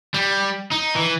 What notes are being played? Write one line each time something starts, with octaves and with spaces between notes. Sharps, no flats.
G3
D#4
E3